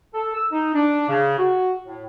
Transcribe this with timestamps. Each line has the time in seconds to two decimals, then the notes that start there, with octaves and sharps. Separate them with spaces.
0.14 A4
0.34 E6
0.52 D#4
0.75 D4
1.08 C#3
1.39 F#4
1.84 A2